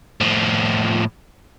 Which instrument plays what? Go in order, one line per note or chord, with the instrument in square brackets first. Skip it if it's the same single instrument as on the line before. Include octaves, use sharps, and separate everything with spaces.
[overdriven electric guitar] A2 F3